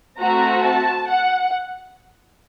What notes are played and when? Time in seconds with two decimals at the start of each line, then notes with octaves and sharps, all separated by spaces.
0.20 A3 C4 F#4 A#5
0.65 A5
1.09 F#5